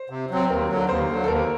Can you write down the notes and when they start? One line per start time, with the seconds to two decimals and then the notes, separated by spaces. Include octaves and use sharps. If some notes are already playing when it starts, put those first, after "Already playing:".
Already playing: C5
0.10 C3
0.31 F#3 C4
0.50 D#2 A#4
0.69 D3 F#3
0.89 D#2 C5
1.09 D3 F#3
1.24 A4
1.28 D#2 A#4